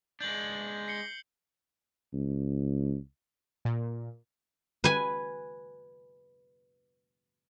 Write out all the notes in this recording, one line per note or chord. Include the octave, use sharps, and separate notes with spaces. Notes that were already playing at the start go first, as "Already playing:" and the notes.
G#3 D4 G6 F#7
C7 C#7 G7
C#2
A#2
B4 G#5